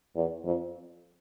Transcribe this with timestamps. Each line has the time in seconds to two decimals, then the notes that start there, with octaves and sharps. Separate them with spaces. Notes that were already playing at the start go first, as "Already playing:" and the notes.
0.16 E2
0.45 F2